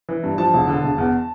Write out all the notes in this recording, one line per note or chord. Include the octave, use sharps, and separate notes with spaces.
E3
G2
F3 A5
E1
D3
E1
E2